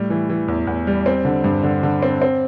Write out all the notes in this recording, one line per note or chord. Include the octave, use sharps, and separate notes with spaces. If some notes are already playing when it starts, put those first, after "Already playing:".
Already playing: A2 G3
E3
E3
E2
E2
G3
C4
D3
G2
D3
D3
C4
C4